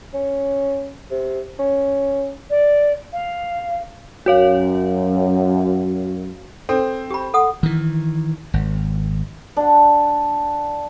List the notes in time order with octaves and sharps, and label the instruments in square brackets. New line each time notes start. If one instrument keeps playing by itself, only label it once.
[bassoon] C#4
C3
C#4
[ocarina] D5
F5
[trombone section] F#2 [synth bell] F#4 C#5 F5
[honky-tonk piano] C4 [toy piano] A4
[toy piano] G4 B5
A4 F#5 D#6
[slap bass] D#3 E3
G#1
[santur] D4 F#5